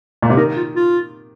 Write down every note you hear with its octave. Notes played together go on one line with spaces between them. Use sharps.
A#2
C3
D#3 A#4
F4
F4